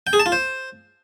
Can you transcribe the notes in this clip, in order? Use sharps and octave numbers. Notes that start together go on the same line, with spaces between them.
G5
G#4
A5
F4
C5